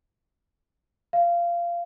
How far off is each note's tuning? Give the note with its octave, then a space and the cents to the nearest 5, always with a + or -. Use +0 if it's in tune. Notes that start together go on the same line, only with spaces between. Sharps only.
F5 -20